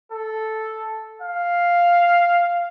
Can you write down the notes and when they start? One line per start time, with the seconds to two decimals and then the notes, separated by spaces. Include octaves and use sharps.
0.11 A4
1.21 F5